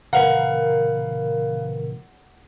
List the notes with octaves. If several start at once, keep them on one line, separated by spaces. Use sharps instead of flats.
A#2 C#3 E3 A#4 B4 F5 F#5